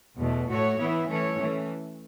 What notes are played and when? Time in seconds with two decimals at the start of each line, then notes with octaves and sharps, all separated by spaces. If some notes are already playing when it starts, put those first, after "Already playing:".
0.19 E2 B2 A3
0.48 A2 A3 F#4 C#5
0.79 E3 B3 E4
1.08 E3 A3 C#4 A4 C#5
1.38 E3 A3 C#4